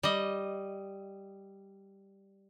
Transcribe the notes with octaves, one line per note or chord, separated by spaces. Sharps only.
G3 D#5